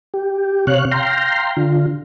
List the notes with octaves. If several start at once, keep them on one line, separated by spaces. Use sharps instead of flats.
G4
C3 C#5 F5 F#6
F5 G5 A#5 C6
D3 F4